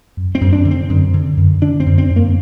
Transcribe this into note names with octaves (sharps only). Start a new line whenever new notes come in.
F#2
C4
F#2
D4
D3
C4
F#2
D3
F#2
D3 D4
C4
F#2
C4
F#2
A#3